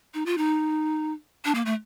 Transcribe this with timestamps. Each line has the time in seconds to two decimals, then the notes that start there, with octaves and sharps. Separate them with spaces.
0.14 D#4
0.26 F4
0.38 D#4
1.45 D4
1.55 A#3
1.66 A3